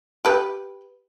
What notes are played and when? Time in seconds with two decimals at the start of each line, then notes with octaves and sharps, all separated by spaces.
0.25 G4 B4